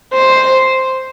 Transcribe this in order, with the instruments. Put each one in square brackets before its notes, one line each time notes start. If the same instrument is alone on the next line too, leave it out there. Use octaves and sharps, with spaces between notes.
[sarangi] C5